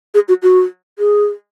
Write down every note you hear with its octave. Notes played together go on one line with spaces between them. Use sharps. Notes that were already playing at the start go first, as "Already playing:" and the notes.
G#4
F#4
F#4
G#4